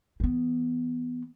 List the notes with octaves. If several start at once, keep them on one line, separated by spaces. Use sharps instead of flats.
E3 B3